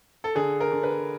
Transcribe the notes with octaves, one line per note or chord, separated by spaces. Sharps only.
A4
D3 G#4
A#4
D3
B4